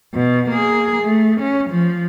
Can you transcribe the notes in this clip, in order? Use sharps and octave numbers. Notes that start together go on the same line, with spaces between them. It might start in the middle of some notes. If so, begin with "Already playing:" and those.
B2
A#3 G#4
A3
C#4
F3